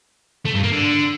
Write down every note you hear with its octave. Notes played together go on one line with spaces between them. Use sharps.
A3
G2
A#3
D3